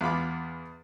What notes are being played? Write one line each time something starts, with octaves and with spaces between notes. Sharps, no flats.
E2 F4 B5 D6